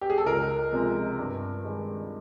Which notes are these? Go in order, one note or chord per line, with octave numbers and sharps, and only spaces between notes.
G4
G#4
A4
C#2 A#4
C3 F3 G#3
G2
D#3 G#3